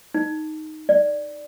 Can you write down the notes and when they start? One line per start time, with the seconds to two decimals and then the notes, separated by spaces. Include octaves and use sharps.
0.14 D#4
0.89 D5